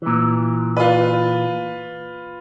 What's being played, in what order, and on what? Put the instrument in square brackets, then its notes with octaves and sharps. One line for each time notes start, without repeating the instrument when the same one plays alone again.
[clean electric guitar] A#2 E3
[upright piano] F4 B4